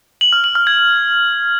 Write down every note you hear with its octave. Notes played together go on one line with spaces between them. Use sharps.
F#7
F6
F#7
F6
G#6